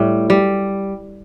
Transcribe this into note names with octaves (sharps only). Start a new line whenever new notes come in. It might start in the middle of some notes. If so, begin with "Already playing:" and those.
Already playing: A2 G3
G3